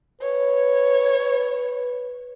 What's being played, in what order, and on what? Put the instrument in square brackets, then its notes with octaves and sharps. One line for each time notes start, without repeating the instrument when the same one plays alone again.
[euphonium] B4 [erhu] C#5